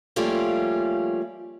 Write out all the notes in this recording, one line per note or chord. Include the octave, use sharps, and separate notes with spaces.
F3 G3 A3 A#3 C#4 F4